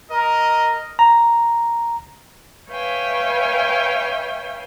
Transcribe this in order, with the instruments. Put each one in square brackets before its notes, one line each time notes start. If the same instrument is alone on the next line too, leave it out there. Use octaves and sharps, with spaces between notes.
[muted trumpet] A#4 [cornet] D#5
[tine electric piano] A#5
[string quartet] B4 C#5 E5 F5 G5 G#5